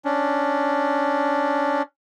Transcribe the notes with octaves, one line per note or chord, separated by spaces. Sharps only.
C#4 D4